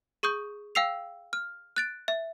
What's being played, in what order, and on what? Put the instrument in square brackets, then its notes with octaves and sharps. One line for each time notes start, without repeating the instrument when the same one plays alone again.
[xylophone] G#4 C#6 D#6 G6
F5 G5 E6 C7 F7
F6
F#6 A6 D7
E5